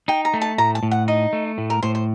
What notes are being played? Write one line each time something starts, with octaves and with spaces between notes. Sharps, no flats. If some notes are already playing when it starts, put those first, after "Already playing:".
D#4 G5
A#5
A3
A5
A2 A#5
A5
A2
F#5
D#4 D#5
A3
A2
A#4
A2 C5
C5